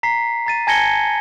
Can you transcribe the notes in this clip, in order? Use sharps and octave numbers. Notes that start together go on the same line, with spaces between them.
A#5 B6 C7
A#5 A6 D#7
G#5 A5 G#6 A#6 C#7 G7